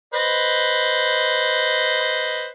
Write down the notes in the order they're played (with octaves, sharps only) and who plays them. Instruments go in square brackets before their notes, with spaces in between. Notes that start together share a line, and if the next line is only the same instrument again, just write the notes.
[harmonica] B4 C5 D#5